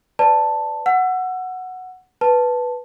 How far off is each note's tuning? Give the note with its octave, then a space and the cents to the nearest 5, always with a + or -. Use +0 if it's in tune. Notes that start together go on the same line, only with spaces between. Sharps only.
B4 +25 D5 +0 A5 +5
F#5 +0 E6 +30
B4 +0 A5 +0